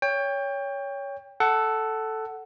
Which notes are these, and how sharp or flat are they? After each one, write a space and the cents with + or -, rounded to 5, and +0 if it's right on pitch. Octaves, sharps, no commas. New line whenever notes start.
C#5 +15 G5 +25
A4 +0 F#5 +15